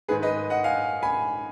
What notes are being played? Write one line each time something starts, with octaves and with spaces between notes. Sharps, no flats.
G#2 D#3 G#3 G#4 B4
B4 D#5
D#5 F#5
F5 G#5
G#5 B5